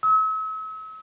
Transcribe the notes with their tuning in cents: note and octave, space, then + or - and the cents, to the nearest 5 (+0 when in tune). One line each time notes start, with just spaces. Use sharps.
E6 -40